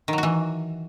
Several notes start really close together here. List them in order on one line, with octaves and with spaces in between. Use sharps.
D#3 F#3 F#4 E3